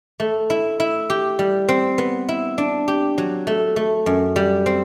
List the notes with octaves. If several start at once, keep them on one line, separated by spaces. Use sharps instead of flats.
A3
E4
E4
G4
G3
C4
B3
E4
D4
G4
F#3
A3
A3
F#2
G3
C4